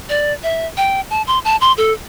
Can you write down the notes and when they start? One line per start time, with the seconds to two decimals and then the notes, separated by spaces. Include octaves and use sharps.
0.09 D5
0.43 E5
0.77 G5
1.10 A5
1.27 C6
1.45 A5
1.61 C6
1.78 A4